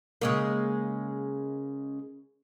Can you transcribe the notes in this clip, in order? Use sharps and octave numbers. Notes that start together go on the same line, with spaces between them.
C#3 G#3 A#3